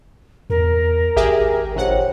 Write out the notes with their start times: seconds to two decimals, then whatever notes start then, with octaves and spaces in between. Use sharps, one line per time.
0.50 E2 A#4
1.16 G#1 G4 G#4 E5
1.76 A#1 G4 C5 C#5 F#5